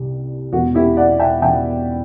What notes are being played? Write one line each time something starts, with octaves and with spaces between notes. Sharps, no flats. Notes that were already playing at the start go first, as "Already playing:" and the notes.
Already playing: C2 C3 G3
E1 E2 B2 F#4
E4 G4
D5 F#5
E5 G5
E1 E2 B2 E5 G5